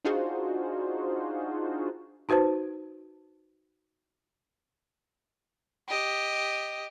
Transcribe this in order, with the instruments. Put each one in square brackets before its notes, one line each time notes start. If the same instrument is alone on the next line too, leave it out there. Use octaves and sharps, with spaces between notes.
[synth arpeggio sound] D4 D#4 F4 F#4 G#4 C5
[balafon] D#4 F#4 B4 C5 A5
[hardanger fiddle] G4 D#5